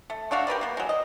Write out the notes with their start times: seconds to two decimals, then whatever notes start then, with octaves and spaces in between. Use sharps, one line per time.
0.10 A3
0.31 A3 D4 F#4 F5
0.47 G4 A#4 B4 D5
0.61 A#3 B3
0.77 F#3 G#3
0.89 D#5